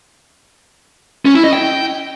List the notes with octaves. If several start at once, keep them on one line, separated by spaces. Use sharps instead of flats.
C#4
E4
D#5
G5